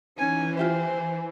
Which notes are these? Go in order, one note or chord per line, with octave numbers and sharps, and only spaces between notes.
E3 C#4 D#4 G#5
F4 G4 C5 E5 G#5